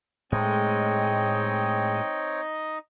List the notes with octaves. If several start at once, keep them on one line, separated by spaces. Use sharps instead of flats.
A2 G#3 A3 C4 D#4 C#5 D#5 G5